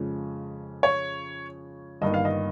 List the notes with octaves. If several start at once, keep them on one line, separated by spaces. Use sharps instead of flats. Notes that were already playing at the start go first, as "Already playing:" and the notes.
Already playing: F2 C#3 F3 G#3 C#4
C#5
G1 G2 D#3 A#3 D#5
F5
D#5